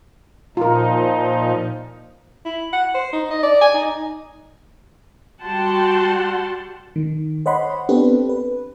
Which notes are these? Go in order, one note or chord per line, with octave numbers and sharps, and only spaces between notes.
A#2 F3 D#4 F4 A#4
E4
F#5
C5
D#4
D#5
D5
G#5
D#4
G3 F#4 F#5 G5 A5 C6
D#3
C5 C#5 D#5 F#5 B5 C6
B3 C4 D4 G4 A4 B4
B4